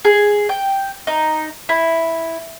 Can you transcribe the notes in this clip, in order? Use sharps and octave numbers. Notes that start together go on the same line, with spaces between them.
G#4
G5
D#4
E4